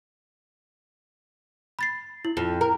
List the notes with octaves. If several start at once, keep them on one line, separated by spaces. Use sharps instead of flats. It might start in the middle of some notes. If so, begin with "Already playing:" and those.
B5 A6 C7
E4
F2
A#4